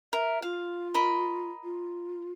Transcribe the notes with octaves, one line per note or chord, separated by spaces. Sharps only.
A#4 E5
F4 F5
A#4 D#5 B5
F4